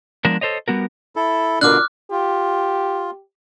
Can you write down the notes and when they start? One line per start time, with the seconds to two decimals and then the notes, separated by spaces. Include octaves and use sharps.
0.25 F3 G#3 B3 D4 A#4
0.41 A4 C5 C#5 D#5
0.68 G3 B3 F#4 A#4
1.16 E4 A4
1.61 B2 D3 D4 F4 A#4 D6 F6 F#6
2.11 F4 G4